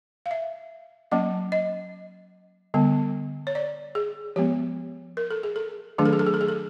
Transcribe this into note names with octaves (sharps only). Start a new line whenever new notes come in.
F5
E5
F#3 A#3 C#4 D#5
D#5
D3 G3 B3
C#5
D5
G#4
F3 G#3 B3 G4
A#4
A4
G#4
A4
D#3 F#3 A3 D4 G#4
A4
G#4
A4
G#4
A4
G#4
A4